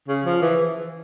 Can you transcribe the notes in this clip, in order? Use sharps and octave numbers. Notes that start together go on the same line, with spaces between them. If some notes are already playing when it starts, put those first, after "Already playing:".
C#3
F3
E3